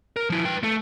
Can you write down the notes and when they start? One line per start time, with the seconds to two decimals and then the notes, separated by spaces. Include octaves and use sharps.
0.16 A#4
0.30 F3 E4
0.45 B4 G5
0.63 A3 A4